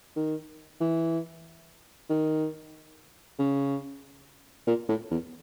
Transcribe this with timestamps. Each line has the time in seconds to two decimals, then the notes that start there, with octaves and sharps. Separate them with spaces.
0.16 D#3
0.80 E3
2.09 D#3
3.39 C#3
4.67 A#2
4.88 A2
5.10 E2